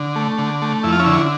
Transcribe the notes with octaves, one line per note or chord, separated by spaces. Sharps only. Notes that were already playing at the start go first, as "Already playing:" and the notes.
Already playing: D3
A3
D3
A3
F2 E4
F4
C#4 E4
D3